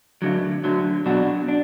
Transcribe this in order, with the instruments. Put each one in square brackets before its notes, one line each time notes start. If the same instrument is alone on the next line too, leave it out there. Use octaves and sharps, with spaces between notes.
[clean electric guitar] D2 D3 F#3
D2 D3 F#3
B2 F#3 D4 F#4
D4